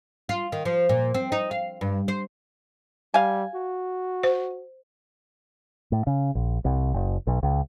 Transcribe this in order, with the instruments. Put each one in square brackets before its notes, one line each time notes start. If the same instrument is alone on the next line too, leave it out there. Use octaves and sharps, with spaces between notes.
[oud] F4
D#3
F3
A#2
C4
D#4
F5
G2
C5
[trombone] G3 [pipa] F5 G#5
[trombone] F#4
[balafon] C5
[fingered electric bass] A2
C#3
A#1
C2
F#1
B1
C#2